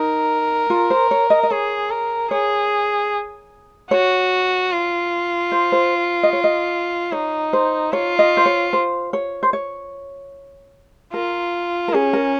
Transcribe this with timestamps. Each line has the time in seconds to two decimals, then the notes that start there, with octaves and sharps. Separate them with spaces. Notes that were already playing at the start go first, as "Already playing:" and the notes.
Already playing: D#4 A#4
0.70 F4
0.90 C5
1.11 C#5
1.30 D#5
1.43 D#5
1.51 G#4 C#5
1.91 A#4
2.31 G#4 C#5
3.91 F#4 C#5
4.72 F4
5.52 C5
5.72 C5
6.23 D#5
6.33 C#5
6.44 D#5
7.12 D#4 C#5
7.53 C5
7.93 F4 C#5
8.19 D#5
8.37 C5
8.46 C#5
8.73 C5
9.13 C#5
9.43 C5
9.53 C#5
11.13 F4 A#4
11.88 A#4
11.94 C#4 G#4
12.13 A#4